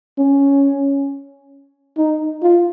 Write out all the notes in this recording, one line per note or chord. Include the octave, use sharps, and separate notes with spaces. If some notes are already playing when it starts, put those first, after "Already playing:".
C#4
D#4
F4